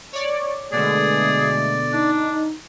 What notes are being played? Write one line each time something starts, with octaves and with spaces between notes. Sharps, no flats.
C#5 D5
B2 D3 G#3 A3 G#4 D5
D4 D#4